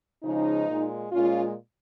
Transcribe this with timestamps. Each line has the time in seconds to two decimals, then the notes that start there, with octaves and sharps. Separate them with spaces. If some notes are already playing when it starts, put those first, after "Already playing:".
0.23 C#3 F3 G#3 D#4
0.68 A#2 G#3
1.12 A#2 G#3 C#4 F4